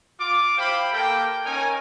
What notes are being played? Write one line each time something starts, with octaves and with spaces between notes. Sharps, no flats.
F4 D6
E4 G4 C5 F5 G5 B5
A#3 A4 G5
C#4 D#4 A#4 G#5